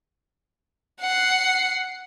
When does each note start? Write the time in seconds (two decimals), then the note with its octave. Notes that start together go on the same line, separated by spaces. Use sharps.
1.01 F#5 C7